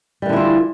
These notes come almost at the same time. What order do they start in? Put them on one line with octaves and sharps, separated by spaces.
G3 E3 D3 E4 F4